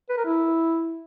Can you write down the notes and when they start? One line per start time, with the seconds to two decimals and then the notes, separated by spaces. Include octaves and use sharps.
0.09 B4
0.17 A#4
0.25 E4